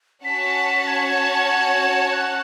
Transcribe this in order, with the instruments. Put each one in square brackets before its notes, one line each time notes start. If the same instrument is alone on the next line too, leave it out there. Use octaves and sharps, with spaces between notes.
[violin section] C#4 F#4 C#5 F#5 A5 [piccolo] B6
[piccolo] G#6
F#6